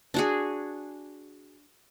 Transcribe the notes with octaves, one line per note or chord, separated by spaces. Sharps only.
D4 F#4 G#4